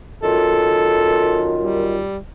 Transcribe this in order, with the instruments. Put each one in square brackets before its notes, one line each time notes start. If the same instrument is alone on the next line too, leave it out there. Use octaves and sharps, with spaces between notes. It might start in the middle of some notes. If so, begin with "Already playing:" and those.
[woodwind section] F#2 D#3 F4 [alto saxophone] A4
[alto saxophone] G3